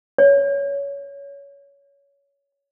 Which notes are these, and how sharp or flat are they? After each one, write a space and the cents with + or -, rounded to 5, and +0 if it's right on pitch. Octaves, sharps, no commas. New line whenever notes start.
C#5 +20